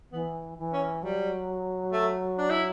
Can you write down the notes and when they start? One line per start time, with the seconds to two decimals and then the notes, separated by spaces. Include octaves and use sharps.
0.12 E3 B3
0.58 E3
0.73 C#4
1.03 F#3 G3
1.93 A3
2.39 D4
2.50 E4